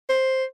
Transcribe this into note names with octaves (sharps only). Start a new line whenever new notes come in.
C5